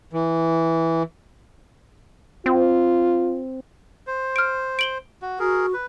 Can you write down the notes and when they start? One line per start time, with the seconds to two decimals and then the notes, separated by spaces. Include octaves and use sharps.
0.13 E3
2.46 C4 F4
4.07 C5
4.36 F6 D7
4.79 D7 F#7 G7
5.22 F#4
5.39 F#4 G#4 A#4
5.74 B4